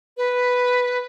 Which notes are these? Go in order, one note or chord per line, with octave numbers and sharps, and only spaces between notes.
B4